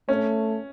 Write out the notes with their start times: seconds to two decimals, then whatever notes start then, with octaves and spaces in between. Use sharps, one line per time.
0.09 A3 C#4